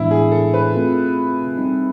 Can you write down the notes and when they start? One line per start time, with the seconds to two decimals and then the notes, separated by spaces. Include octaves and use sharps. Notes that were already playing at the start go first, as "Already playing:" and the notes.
Already playing: A2 E3 G#3 B3 D4 E4
0.11 G#4
0.32 A4
0.54 B4
0.73 A3 C4 F4 A4
1.57 G3 C4 D#4